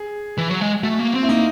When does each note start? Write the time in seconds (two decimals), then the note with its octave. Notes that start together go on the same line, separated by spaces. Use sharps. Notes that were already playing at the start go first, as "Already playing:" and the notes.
Already playing: G#4
0.38 E3
0.49 F#3
0.61 G#3
0.83 A3 F#4
0.99 A#3
1.14 C4
1.23 E4
1.29 A#3 D#4